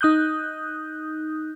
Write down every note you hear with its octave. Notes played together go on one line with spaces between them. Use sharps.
D#4 D#6 F#6 G6